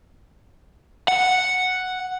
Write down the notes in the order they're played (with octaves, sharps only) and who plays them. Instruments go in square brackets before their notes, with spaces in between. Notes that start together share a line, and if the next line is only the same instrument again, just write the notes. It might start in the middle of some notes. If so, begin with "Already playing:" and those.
[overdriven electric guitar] F#5